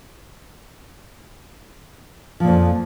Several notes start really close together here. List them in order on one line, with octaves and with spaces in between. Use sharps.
F3 A#2 F2